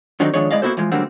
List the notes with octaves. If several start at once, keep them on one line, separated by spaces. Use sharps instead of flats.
D3 D#3 F#3 C4 D4 D#4
D#3 F3 G#3 D4 C#5
G#3 E4 D5 D#5 F5
A#3 B3 E4 F#4 A4 C5
E3 F3 G#3
D3 F#3 G3 A3 A#3 C4